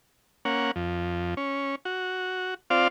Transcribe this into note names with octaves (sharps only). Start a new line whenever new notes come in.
A#3 C#4 F#5
F2
C#4
F#4
C4 F4 D5 F5